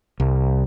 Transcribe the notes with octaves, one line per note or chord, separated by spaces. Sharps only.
C2